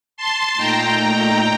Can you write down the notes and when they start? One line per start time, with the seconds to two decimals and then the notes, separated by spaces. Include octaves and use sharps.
0.17 A5 C6
0.58 A#2 A3 D#4 G5 A#5